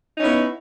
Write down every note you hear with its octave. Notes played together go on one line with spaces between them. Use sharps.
B3 C#4 D#4 E4